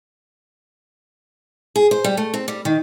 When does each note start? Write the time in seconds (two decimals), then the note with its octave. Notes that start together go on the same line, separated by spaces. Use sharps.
1.76 G#4
1.91 C5
2.04 G3
2.17 A3
2.34 C4
2.48 G3
2.65 D#3